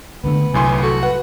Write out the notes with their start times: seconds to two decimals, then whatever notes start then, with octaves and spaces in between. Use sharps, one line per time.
0.24 C#2 D3 A3 B3
0.54 G1 C2 A2 F#3 G#5 C6
0.83 F#4 A4
1.03 B4 F#5